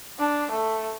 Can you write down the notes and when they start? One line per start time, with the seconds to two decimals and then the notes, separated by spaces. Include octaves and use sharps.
0.19 D4
0.50 A3